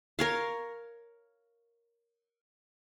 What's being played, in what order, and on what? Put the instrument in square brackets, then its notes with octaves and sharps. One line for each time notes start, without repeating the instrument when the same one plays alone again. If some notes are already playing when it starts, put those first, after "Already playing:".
[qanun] A#4 C#5 F5